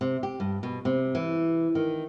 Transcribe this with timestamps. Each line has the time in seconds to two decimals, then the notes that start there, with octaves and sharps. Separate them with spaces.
0.01 C3
0.23 G4
0.40 G2
0.63 B2
0.85 C3
1.15 E3
1.75 D#3